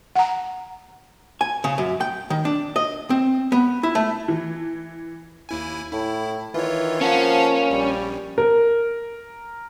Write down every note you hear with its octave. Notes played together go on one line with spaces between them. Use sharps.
F#5 A#5
G#5
C#3
F#2
G5
D#3
D4
D#5
C4
B3
E4
A3
E3
D#2 E4 G#5
A2 E4
D#3 E3 F4 C#5
F3 A#3 C#4 F5 F#5 A5
A#1 G3
A#4